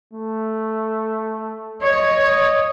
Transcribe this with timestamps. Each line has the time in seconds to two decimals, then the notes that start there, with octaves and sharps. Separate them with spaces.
0.13 A3
1.82 C#5 D#5